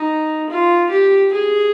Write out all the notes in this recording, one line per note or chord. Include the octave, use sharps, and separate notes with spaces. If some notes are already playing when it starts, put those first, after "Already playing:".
Already playing: D#4
F4
G4
G#4